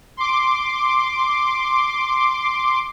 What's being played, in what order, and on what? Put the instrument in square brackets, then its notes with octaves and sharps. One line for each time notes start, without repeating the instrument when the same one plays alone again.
[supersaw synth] C6 D6